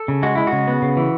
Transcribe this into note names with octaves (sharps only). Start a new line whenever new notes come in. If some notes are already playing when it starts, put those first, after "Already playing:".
Already playing: A4
C#3
G#3 F#4
G#3 E4
F#4
C#3
B3
C#3
E3